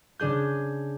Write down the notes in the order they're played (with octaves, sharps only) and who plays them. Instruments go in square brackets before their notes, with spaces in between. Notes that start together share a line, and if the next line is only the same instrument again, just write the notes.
[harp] C#3 D4 G#4 G6